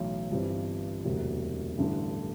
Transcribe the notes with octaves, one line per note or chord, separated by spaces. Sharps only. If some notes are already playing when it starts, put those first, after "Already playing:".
Already playing: B1 A2 E3
G1 G2 E3 G3 C4
E1 D2 C3 F#3
A1 G2 D3 A3